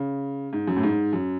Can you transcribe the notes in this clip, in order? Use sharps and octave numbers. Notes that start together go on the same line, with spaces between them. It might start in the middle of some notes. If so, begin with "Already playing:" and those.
Already playing: C#3
G#2
F#2
A2
G#2
F#2